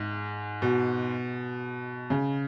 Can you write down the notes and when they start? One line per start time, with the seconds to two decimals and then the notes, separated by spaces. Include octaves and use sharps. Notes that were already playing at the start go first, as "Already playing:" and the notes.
Already playing: G#2
0.62 B2
2.10 C#3